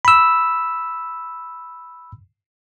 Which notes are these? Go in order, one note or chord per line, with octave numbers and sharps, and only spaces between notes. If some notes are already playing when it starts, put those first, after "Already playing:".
B5 E6